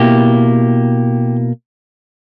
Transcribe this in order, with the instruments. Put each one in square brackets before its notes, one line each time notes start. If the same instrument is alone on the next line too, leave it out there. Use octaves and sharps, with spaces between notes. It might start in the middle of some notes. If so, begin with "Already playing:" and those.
Already playing: [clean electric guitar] B2 A#3 E4 G4